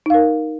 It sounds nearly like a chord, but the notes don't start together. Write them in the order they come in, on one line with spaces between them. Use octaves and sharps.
D#4 F5 A#4